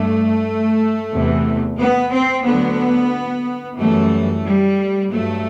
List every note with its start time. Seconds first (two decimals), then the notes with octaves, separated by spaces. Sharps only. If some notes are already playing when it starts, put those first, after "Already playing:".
Already playing: G2 A3
1.11 E2 C3 E3
1.78 B3
2.11 C4
2.44 D2 D3 F#3 B3
3.78 F#2 E3 G3 A3
4.44 G3
5.12 G2 F#3 A3